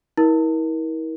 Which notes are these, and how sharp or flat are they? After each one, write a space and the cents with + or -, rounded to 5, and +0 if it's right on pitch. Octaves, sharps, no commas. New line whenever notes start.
E4 -40 A#4 +25